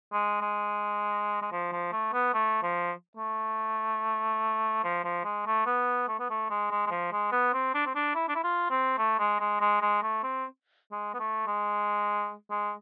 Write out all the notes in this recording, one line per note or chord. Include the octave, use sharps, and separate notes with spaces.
G#3
G#3
G#3
F3
F3
A3
B3
A3
F3
A3
F3
F3
G#3
A3
B3
A3
B3
A3
G#3
G#3
G#3
F3
G#3
B3
C4
D4
C4
D4
E4
D4
E4
F4
C4
A3
G#3
G#3
G#3
G#3
A3
C4
G#3
B3
A3
G#3
G#3